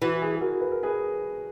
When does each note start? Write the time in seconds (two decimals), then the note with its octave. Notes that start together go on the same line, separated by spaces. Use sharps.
0.02 E3 F#4
0.22 G#4
0.36 G#4
0.41 F#4 A#4
0.60 B4
0.71 A#4
0.83 G#4 B4